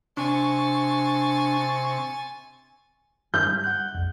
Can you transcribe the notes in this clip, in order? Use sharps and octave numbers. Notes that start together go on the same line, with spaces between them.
C3 D4 G#5 C#6 A6
G2 D4 F6 G6
G3
F#5 F#6
A#1 F2